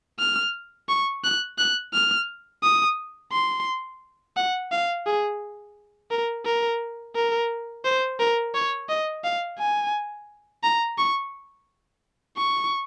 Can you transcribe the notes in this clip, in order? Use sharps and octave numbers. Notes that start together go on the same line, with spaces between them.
F6
C#6
F#6
F#6
F6
D#6
C6
F#5
F5
G#4
A#4
A#4
A#4
C5
A#4
C#5
D#5
F5
G#5
A#5
C#6
C#6